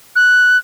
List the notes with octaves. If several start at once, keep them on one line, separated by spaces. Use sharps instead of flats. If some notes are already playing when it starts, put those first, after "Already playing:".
F#6